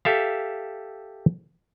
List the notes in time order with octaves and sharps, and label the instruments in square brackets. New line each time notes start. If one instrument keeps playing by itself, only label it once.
[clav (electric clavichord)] G4 A4 E5 F5